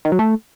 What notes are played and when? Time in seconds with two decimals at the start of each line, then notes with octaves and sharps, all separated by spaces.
0.05 D#3
0.12 F#3
0.19 A3